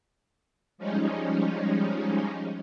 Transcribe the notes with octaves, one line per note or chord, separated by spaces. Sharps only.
F3 G3 G#3 C#4 D#4